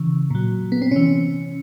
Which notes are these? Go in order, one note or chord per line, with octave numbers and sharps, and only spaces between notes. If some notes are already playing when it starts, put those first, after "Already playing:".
Already playing: C#3 E3
A#2 F#3
B3
C4
C3 E3 C#4